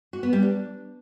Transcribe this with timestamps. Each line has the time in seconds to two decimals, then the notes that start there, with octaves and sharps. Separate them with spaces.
0.13 F#4
0.23 B3
0.33 G3
0.42 D4